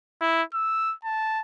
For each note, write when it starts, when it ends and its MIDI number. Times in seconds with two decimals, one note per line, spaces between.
0.21 0.42 64
0.54 0.94 88
1.04 1.41 81